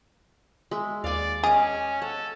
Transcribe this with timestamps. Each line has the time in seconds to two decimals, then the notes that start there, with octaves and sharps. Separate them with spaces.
0.71 G#3 E5
1.04 D#2 D5 F5 G#5
1.43 C#4 G#4 D#5 F5 D6
2.02 A4 F#5